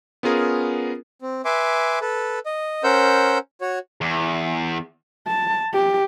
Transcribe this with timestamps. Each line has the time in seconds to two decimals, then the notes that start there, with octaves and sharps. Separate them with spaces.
0.23 B3 C#4 F4 G#4 A#4
1.22 C4
1.45 B4 E5 G#5 C6 D6
2.01 A4 B4
2.46 D#5
2.83 C#4 A#4 C5 F#5 E6 G6
3.61 F#4 C#5
4.01 E2
5.27 A5
5.74 G4